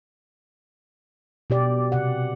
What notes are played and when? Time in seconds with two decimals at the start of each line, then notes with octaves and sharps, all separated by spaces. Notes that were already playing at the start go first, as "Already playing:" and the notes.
1.50 B2 G4 D5
1.92 C3 F#5